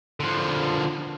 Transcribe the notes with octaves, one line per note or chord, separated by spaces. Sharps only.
D3 F3